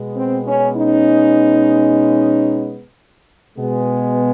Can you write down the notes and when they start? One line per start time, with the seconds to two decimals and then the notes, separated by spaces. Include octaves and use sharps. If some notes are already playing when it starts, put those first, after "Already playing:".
Already playing: B2 G#3 B3
0.16 C4
0.46 C#4
0.77 C#4 D#4
3.57 B2 G#3 B3